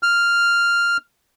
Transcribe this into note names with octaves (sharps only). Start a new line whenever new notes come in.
F6